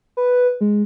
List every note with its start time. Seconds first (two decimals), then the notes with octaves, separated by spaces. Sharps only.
0.17 B4
0.61 G#3